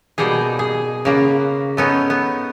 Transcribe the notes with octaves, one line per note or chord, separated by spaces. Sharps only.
B2 G3 A#3 D#4 G#4
G#4
C#3 A#3 B3
A3 B3 C#4 D#4
B3